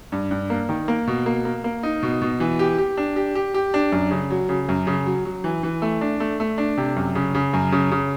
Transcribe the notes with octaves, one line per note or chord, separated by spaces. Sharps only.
G2
G2
A#3
D#3
A#3
B2
A#3
A#3
A#3
D#4
B2
B2
E3
G4
G4
D4
G4
G4
G4
D4
F#2
C#3
F#3
C#3
F#2
C#3
F#3
F#3
E3
E3
A3
D4
A3
A3
D4
C3
F#2
C#3
C#3
F#2
C#3
C#3